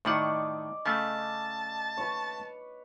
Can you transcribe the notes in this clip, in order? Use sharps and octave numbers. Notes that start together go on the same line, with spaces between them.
A2 D#3 D5 D#5 F#5 C#6
C#3 A3 A5
B4 C#5